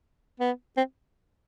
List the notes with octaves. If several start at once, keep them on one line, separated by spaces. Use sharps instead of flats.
B3
C4